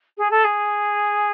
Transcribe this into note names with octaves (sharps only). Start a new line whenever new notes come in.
G#4
A4
G#4